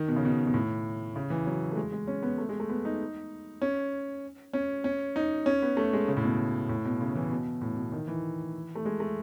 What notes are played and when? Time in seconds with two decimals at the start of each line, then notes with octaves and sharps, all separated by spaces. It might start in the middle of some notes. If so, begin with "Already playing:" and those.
Already playing: D#3
0.08 B2
0.16 C#3
0.25 B2
0.47 B2
0.54 A2
1.16 C#3
1.30 E3
1.46 F#3
1.71 A3
1.76 G#3
1.92 G#3
2.07 C#4
2.23 B3
2.38 A3
2.49 G#3
2.60 A3
2.69 B3
2.85 D#4
3.62 C#4
4.53 C#4
4.84 C#4
5.16 D#4
5.46 C#4
5.62 B3
5.77 A3
5.93 G#3
6.08 C#3
6.17 A2
6.24 B2
6.69 A2
6.85 B2
7.01 C#3
7.15 E3
7.31 B2
7.61 A2
7.77 B2
7.92 D#3
8.07 E3
8.75 A3
8.85 G#3
9.00 A3